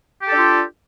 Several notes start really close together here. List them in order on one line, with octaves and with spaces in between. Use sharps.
G4 A4 D4 F4